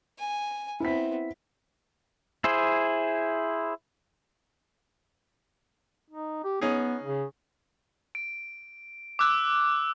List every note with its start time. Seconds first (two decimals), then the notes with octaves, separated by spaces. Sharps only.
0.19 G#5
0.80 B3 C4 E4 E5 B6
2.44 E4 G#4 C5
6.10 D#4
6.44 G4
6.61 B3 C#4 D#4 G#4
7.03 C#3
8.15 D7
9.19 D6 E6 F#6